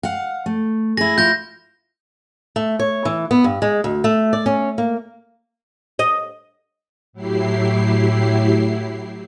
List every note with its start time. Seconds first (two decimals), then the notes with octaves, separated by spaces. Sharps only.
0.03 F5 F#5
0.46 A3
0.97 E4 G#4 A#6
1.18 E4 F4 G6 A#6
2.56 A3
2.79 C#5
3.05 E3
3.31 B3
3.44 G2
3.62 G#3
3.84 D2
4.04 A3
4.33 D5
4.46 C#4
4.78 A#3
5.99 D#5
7.13 A2 F#3 E4 G4 C7